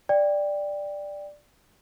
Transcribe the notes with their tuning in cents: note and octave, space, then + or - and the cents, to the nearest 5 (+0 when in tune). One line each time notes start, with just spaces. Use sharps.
D5 +0 G5 +10